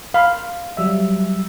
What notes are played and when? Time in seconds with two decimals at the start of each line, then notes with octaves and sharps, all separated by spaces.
0.14 F5 B5
0.77 F#3 G3 E5